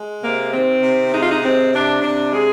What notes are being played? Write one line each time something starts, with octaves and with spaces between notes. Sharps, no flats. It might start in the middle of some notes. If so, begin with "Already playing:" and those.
Already playing: G#3
C3 A#3
D#3 C4
C3
G#3 D#4
F4
D#4
C3 C4
C3 D4
C3 D4
G#3 G#4